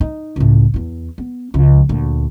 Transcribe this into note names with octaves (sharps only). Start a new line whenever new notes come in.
D#4
C#2 A2
E2 E4
B3
C#2 F3
D2 A#2